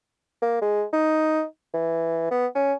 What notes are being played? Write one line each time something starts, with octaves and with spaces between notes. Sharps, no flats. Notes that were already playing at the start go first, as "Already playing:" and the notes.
A#3
G#3
D#4
E3
B3
C#4